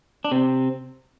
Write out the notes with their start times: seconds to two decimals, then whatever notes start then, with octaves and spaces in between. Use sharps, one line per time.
0.25 D4
0.31 C3 C4